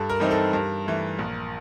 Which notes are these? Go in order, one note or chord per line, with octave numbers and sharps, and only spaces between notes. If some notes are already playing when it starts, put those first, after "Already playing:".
Already playing: G2 A4
A#4
E3 G3 C4 D#4
A4
G2 A#4
E3 A3
A#1